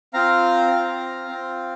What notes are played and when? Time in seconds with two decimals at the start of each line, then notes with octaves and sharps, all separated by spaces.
0.13 C4 F4 F5 A#5
0.71 C4 F4
1.29 C4 F4